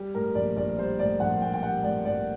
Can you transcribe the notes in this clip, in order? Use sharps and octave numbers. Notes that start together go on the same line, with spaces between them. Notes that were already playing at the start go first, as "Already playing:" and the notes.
Already playing: G3 G4
A2 A#4
A#1 D5
A#1 D5
G3 C5
A2 D5
A#1 F#5
A#1 G5
G5
G3 F#5
A2 D5
A#1 D5